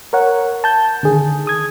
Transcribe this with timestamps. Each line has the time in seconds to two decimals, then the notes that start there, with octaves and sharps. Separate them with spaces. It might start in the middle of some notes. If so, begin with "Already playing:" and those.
0.13 A#4 C#5 F#5
0.64 A5 G6
1.03 D3 D#3 G#4
1.47 D#6 G#6